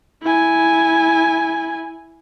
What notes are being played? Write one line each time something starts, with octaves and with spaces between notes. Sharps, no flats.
E4 G#5